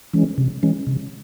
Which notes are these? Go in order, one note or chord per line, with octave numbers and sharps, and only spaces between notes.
E3 G#3 C#4
C3
E3 G#3 C#4
C3